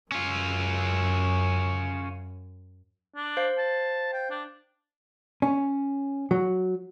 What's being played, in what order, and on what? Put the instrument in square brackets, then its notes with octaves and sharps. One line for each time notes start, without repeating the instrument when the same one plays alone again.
[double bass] F#2 [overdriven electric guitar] C#4 F4
[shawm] D4
[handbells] C5 F5
[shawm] A5
G5
D4
[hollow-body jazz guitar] C#4
F#3